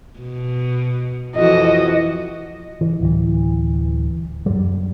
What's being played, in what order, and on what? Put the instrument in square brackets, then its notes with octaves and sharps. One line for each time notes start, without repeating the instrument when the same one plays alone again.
[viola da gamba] B2
[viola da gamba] F2 E3 F#4 [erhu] D#5
[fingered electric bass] E3
D1 E3
F#2 G3